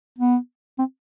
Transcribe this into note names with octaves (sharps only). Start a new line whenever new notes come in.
B3
C4